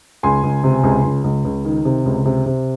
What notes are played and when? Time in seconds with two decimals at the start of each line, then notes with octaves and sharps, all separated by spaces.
0.23 C#2 G#5 C6
0.43 C#2
0.64 C3
0.83 C#2
1.04 C#2
1.24 C#2
1.45 C#2
1.65 D#3
1.85 C3
2.06 C#2
2.26 C3
2.46 C3